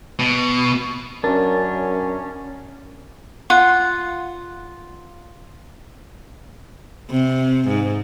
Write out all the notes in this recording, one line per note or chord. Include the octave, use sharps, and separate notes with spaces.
B2
F#2 C#4 D4 A#4
F4 F#5
C3
G#2